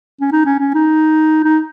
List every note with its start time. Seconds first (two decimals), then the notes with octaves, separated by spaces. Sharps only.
0.21 C#4
0.32 D#4
0.45 C#4
0.59 C#4
0.74 D#4
1.44 D#4